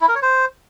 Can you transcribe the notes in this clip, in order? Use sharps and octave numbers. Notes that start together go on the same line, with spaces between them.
E4
A#4
C#5
C5